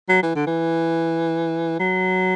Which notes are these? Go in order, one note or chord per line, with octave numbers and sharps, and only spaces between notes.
F#3
E3
D3
E3
F#3